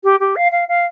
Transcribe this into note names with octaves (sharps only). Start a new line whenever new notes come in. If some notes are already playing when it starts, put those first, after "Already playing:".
G4
G4
F5
F5
F5